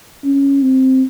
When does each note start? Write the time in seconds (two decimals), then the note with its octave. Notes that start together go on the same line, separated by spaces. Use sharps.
0.24 C#4
0.62 C4